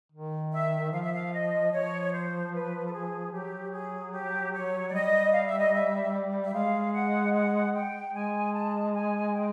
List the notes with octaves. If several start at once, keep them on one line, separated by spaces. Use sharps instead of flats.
D#3
E5
F3 F5
E5
F5
D#5
F3 C#5
C5
B4
A4
G#4
F#3 G4
G#4
G4
C#5
D5
G3 D#5
F5
E5
D#5
E5
E5
G#3 F5
F#5
F#5
G5
G#3 G#5
A5
G#5
G5